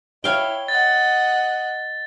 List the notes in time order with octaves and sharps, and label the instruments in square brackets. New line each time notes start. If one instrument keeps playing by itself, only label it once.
[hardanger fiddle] E4 [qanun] C#5 F5 G5 [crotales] G7
[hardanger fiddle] D#5 F#5 [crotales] A6